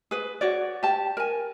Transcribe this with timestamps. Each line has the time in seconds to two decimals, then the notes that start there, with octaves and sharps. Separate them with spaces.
0.11 G#4 B4
0.41 F#4 C#5 D5
0.83 G4 A5
1.17 A#4 G#5